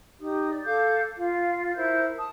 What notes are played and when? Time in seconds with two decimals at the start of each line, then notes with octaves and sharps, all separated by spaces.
0.21 D#4 G4 D#6
0.50 D5
0.65 A4 F5 D6 G6
1.17 F4 F5
1.76 E4 A#4 C5 G6
2.18 A5 D#6